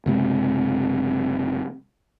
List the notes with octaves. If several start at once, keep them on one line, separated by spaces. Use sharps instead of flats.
F#1 C3 G#3